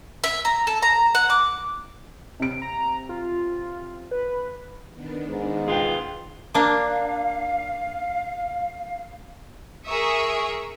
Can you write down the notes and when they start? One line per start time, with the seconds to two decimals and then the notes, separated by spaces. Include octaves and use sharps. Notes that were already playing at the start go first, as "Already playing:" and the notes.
0.24 E5
0.45 A#5
0.67 A4
0.83 A#5
1.15 F#5
1.30 D6
2.40 C3 D7
2.62 A#5
3.09 F4
4.11 B4
4.94 D#3 B3 D4
5.27 G#2
5.68 F4 G#4 B4 F#5 G5
6.54 A#3 D4 F5
9.85 G#4 A#4 E5 C#6 D#6